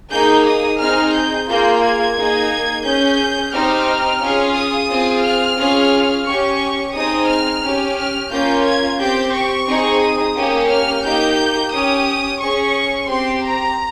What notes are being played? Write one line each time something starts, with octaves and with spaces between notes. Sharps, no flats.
A#3 D#4 G#4 G6
D#6
C4 D#4 G#4 F6
G6
A#3 F4 G#4 G6
G#6
A#3 D#4 G#4
C#4 G#4 G6
C4 D#4 G4 F6
C#4 F4 G#4
D#6
C4 F4 G#4
F6
C#4 F4 G#4
C#4 G4 C#6
C4 D#4 G#4 D#6
F6
C#4 G4
F6
A#3 C#4 F4 G6
G#6
C4 G4 G6
C#6
C4 D#4 G#4
D#6
A#3 C#4 G4
F6
A#3 D#4 G4 G6
C#4 G4 D#6
C#4 G#4 C#6
C4 G4 C6
A#5